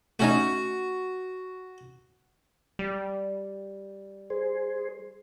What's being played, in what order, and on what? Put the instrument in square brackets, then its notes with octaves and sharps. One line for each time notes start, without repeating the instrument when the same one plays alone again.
[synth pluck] A3 C#4 D#4 [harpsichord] F#4
[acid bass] G3
[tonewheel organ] G#4 C5